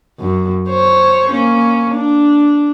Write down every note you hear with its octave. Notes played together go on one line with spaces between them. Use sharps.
F#2
C5 C#5
A#3 C#4
D4